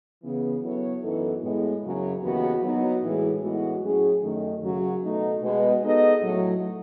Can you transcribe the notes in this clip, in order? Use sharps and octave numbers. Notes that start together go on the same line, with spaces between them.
C#3 E3 B3
F#3 B3 E4 A4 C#5
F#2 E3 B3 D#4 A4
A2 G#3 B3
F#2 C#3 F#3 C#4
D#2 C#3 E3 B3 F#4
F#3 B3 D#4
A2 E3 G#3
A2 E3 G#3 B3 F#4
A2 F#3 C#4 G#4
F#2 D#3 A3
F#2 C#3 F#3 C#4 F#4
B2 A3 D#4 A4
B2 G#3 B3
G#3 B3 D#4 A4 D#5
A2 F#3 A3